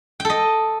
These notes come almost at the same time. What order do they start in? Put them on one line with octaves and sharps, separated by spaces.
G5 A4 D#5